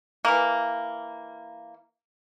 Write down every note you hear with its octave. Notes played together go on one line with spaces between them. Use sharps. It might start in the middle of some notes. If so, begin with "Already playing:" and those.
E3 A#3